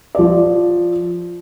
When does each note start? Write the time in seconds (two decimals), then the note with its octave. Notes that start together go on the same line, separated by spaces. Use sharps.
0.15 F3 D5